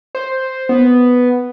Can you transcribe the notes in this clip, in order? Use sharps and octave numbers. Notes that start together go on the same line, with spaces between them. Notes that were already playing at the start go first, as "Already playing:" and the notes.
C5
B3